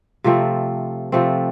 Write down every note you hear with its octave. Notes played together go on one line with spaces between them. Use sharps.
C3 F3 A3 C4
C3 F3 A3 C4